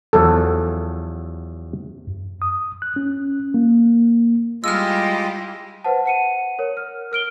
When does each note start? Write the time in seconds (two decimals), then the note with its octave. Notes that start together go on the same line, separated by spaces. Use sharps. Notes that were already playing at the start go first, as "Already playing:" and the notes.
0.13 E2 F3 F#3 A4
2.07 F#2
2.42 D#6
2.82 F#6
2.96 C#4
3.54 A#3
4.64 G3 G#3 E4 F4 G4 D#5 E6 F6
5.84 B4 C5 F#5 A5
6.06 F#5 C#7 D#7
6.59 A#4 C#5
6.77 F6
7.12 A#4 F6 D7 G7